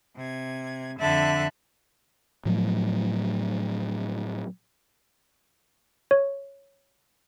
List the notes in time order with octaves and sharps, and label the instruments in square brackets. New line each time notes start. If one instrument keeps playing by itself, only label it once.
[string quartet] C3 G#6
F2 D3 E5 A5 B5 F#6
[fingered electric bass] A2 F3 F#3 A3
[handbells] C#5